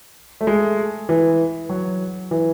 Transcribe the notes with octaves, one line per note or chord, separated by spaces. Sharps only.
A3
G#3
E3
F#3
E3